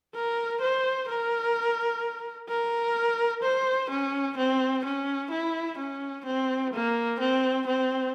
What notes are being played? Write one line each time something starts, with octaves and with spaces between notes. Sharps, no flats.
A#4
C5
A#4
A#4
C5
C#4
C4
C#4
E4
C#4
C4
A#3
C4
C4